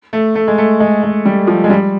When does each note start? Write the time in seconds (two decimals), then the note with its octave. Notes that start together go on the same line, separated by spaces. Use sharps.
0.13 A3
0.35 A3
0.48 G#3
0.58 A3
0.80 G#3
1.03 G#3
1.25 G3
1.47 F3
1.64 G#3
1.70 G3